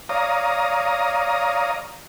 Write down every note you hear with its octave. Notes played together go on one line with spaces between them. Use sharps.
C#5 D5 F5 A#5 D#6